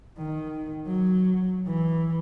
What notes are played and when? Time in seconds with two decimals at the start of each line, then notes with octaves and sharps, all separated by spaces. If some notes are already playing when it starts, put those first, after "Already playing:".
0.18 D#3
0.87 F#3
1.66 E3